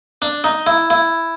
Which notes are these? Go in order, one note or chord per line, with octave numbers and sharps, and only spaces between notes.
D4
D#4
E4
E4